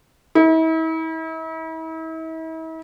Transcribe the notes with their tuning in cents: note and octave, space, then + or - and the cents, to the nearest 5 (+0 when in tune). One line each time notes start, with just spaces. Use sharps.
E4 -40